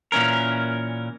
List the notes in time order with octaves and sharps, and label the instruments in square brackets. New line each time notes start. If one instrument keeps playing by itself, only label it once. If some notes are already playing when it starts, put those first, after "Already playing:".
[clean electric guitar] A#2 E3 C#4 A#4